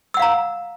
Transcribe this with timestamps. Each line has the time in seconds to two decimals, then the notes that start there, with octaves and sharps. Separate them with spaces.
0.14 E6
0.17 F#5
0.20 F5
0.22 A#5